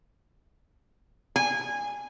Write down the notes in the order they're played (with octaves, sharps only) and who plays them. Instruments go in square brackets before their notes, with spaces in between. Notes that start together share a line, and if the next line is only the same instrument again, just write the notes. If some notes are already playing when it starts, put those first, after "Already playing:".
[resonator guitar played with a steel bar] G#5